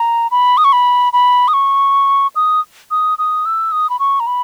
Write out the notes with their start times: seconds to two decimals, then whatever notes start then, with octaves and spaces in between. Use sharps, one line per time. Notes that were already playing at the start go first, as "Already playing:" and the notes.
Already playing: A#5
0.31 B5
0.57 D#6
0.64 C#6
0.73 B5
1.13 B5
1.48 D#6
1.54 C#6
2.36 D#6
2.91 D#6
3.18 D#6
3.46 E6
3.72 D#6
3.90 B5
3.99 C#6
4.20 A#5
4.27 B5